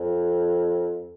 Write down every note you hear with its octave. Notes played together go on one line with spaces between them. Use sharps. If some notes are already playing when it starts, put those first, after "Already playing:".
Already playing: F2